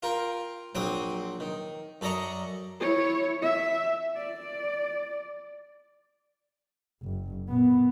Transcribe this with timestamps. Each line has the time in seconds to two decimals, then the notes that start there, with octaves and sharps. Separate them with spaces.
0.03 F4 A#4 G5
0.75 A#1 F#3 C4 G5 D6 D#6
1.40 D#3
2.01 F#2 A4 D5 D#5 A#5 C#6
2.80 E4 C#5
3.42 E5
4.17 D5
7.02 F#1
7.48 A#2 B3